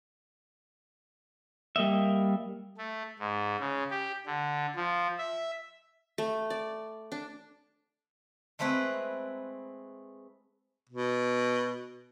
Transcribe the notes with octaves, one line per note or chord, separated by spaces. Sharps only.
G3 A#3 D#5 E5
A3
G#2
C#3
G4
D3
F3
E5
A3
D5
D4
G#3 A3 C4 E4 B4
B2